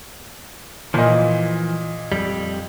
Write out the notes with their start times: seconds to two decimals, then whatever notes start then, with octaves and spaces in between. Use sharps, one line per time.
0.94 A#2 E3 F3 D#5
2.12 F2 G3